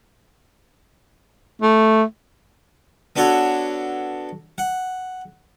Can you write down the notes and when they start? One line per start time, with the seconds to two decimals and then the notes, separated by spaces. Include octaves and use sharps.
1.62 A3
3.16 B3 D4 F#4 A4 C#5
4.58 F#5